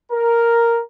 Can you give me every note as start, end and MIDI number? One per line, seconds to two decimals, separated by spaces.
0.11 0.80 70